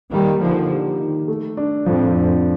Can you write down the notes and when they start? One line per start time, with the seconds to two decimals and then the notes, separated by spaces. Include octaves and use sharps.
0.12 D#3 G3 A#3
0.41 D3 F3 D#4
0.70 G4
0.99 D#3
1.28 A3
1.57 D4
1.86 F2 A2 F3
2.16 F2 D4